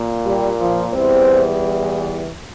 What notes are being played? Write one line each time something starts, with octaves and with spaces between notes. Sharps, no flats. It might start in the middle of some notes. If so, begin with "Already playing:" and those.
Already playing: A#2 A#3
G3 G4
F3 F4
E2 E3 G3 C4 C5